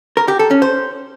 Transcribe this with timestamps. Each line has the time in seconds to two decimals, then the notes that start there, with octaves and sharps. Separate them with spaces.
0.17 A#4
0.28 G4
0.39 A4
0.51 C#4
0.62 C5